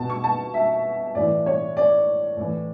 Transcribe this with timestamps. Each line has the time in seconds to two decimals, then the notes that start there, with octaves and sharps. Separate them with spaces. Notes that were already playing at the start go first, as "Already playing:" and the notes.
Already playing: B2 A5
0.10 C#6
0.24 A5
0.54 E5
1.15 A2 E3 D5
1.46 C#5
1.77 D5
2.37 A2 E3